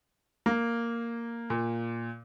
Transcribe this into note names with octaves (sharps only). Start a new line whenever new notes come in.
A#3
A#2